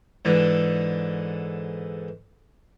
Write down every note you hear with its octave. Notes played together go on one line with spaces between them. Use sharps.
G#2 D3 E3